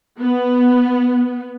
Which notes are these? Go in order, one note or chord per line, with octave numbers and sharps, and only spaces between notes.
B3